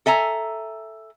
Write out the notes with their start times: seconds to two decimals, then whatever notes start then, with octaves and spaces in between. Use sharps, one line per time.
0.06 A4 E5 G#5 A#5